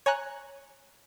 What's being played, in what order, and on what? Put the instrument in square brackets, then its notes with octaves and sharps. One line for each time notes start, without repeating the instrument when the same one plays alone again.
[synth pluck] C#5 G#5 A#5 F#6